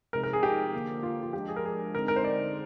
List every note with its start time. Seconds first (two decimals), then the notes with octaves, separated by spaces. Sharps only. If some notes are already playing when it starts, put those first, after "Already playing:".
0.13 C3 F3 G#3 D#4 A#4
0.24 A#4
0.33 G#4
0.43 G4
0.73 D3 F3 A#3
1.03 F4
1.22 F4
1.33 F3 G#3 D4 G4
1.48 G#4
1.56 A#4
1.65 G#4
1.94 D3 G#3 C4 D#4 A#4
2.08 A#4
2.16 C5
2.24 D5